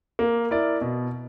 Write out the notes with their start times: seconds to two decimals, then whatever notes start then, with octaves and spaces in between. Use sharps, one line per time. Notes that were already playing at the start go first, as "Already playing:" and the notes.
0.19 A#3
0.51 E4 A#4 D5
0.81 B2